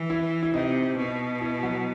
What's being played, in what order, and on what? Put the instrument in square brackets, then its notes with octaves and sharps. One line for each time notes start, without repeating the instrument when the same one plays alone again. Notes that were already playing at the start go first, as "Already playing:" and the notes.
Already playing: [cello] E3
[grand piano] E4
E4
[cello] C3 [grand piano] D#4
[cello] B2
[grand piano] E4
F#3 F#4